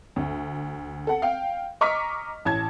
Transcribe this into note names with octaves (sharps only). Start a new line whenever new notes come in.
D2
A4 F#5
F5 G5
D#5 A#5 C#6 D6 F6 B6
A1 A5 G#6